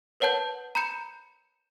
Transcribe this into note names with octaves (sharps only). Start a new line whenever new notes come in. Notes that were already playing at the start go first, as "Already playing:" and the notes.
A#4 B4 C#5 F#5 A5 G6
A#5 B5 G6 C#7 E7